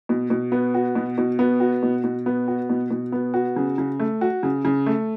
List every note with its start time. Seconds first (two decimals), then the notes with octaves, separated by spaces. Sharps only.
0.09 B2
0.30 B2
0.52 B3
0.74 F#4
0.95 B2
1.18 B2
1.39 B3
1.60 F#4
1.83 B2
2.04 B2
2.26 B3
2.48 F#4
2.70 B2
2.91 B2
3.12 B3
3.34 F#4
3.56 C#3
3.78 C#3
3.99 A3
4.21 F#4
4.43 C#3
4.65 C#3
4.86 A3